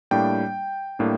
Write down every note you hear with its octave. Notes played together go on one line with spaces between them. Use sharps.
A2 G3 A#3 D4 G5
A2 G3 A#3 D4